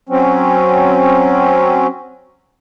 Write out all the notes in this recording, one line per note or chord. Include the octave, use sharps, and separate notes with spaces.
F#3 C4 C#4